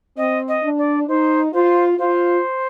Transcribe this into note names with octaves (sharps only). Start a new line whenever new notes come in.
C4 D#5
D#5
D4
D5
D#4 C5
F4 C5
F4 C5